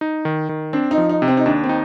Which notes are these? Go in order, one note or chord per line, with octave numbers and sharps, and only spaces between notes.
D#4
D#3
D#3
C4 D4
D#4
F3
D#4
C3
C4
D#4
D#2 D4
C4
D#4